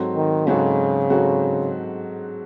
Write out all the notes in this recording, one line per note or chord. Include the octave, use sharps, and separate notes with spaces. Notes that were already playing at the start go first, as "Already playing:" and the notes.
Already playing: G#2 F#3 C4 F#4 A4
D#3
G#2 C#3 F#3 C4 F#4 A4
G#2 F#3 C4 F#4 A4